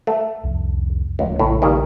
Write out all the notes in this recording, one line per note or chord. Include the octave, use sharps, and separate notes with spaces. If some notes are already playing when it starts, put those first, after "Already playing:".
A3
C2 F2
D#1 C#2 F3 A3
A#1 A2 C#3
D#3 G3 A#3